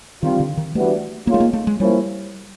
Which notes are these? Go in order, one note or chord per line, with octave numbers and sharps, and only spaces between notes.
D#3 G3 C4 F4
D3
D#3
E3 G3 A3 B3 D4 F#4
D#3 G#3 A#3 C#4 F4
A3
A#3
A3
G#3
F3 G3 A#3 C#4 E4